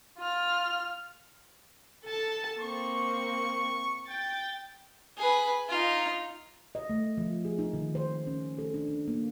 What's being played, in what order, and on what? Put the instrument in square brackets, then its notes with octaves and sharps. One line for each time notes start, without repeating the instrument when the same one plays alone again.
[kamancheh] F4 F6
[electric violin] A4 A5
[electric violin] A#3 C4 [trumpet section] C#6
[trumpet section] G5 [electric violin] A6
[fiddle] G#4 B4
D#4 F4
[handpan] D#5
A3
F3
G#4
D#4
D#3
C5
C#4
A4
D4
D4
A#3